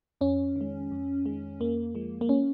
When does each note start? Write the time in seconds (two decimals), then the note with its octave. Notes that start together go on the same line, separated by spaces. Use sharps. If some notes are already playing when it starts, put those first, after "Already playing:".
0.21 F2 C#4
0.56 D#3 G#3
0.91 F2
1.26 D#3 G#3
1.60 F2 A#3
1.95 F3 G#3
2.21 A#3
2.29 C#4